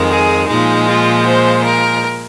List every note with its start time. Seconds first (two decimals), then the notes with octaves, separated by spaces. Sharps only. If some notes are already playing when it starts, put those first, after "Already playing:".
Already playing: F2 D#3 G#3
0.10 G#4
0.47 A#2 F3 G#3 D#4
0.87 F4
1.25 C5
1.63 A#4